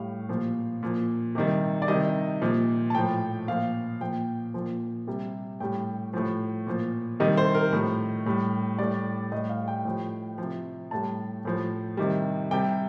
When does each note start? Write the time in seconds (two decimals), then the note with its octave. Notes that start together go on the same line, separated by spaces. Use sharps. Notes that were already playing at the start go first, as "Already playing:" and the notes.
Already playing: A2 G3 F5
0.29 A#2 F3
0.83 A#2 F3
1.35 C3 D#3 G3
1.82 D5
1.88 C3 D#3 G3 D#5
2.42 A#2 F3
2.90 A5
2.95 A2 F3 G5
3.47 A#2 F3 F5
4.01 A#2 F3 G5
4.54 A#2 F3
5.07 C3 G3
5.60 A2 G3 G5
6.13 A2 F3
6.66 A#2 F3
7.20 C3 D#3 G3 D#5
7.37 C5
7.55 A#4
7.73 A2 F3
8.26 A2 G3
8.78 A2 G3 D5
9.32 A2 G3 D#5
9.49 F5
9.68 G5
9.85 A2 F3
10.38 C3 F3
10.91 A2 G3 A5
11.45 A2 F3
11.97 C3 D#3 G3
12.51 C3 G3 G5